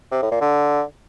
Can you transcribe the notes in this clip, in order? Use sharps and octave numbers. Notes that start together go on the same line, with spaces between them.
C3
A2
A#2
D3